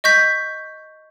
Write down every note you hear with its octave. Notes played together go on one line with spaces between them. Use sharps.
D#5 C#6 G6 B6